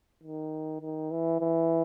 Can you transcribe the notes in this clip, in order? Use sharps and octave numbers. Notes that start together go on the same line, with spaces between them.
D#3
D#3
E3
E3